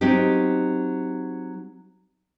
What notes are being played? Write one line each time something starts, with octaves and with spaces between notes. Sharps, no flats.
F#3 C4 D#4 G4